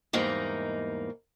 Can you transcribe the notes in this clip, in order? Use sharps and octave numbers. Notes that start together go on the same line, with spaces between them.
E2 G#2 G3 A#3 D#4